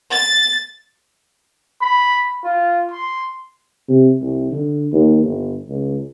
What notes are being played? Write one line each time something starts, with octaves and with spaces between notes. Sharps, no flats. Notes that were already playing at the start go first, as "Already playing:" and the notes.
A6
B5
F4
C6
C3
C2
D3
D#2
G1
C#2